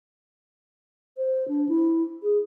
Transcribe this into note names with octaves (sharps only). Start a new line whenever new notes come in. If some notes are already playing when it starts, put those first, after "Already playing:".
C5
D4
E4
G#4